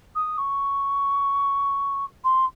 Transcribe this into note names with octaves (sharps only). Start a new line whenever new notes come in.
D#6
C#6
C6